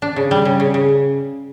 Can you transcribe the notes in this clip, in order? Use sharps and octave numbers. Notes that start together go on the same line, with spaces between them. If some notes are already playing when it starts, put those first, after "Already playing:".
D4
C#3
G3
C#3
C#3
C#3